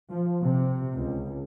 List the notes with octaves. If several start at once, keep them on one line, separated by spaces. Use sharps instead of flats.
F3
C3
C#2